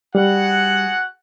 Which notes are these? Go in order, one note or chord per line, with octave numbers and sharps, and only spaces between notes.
G3 F#4 G#4 F#5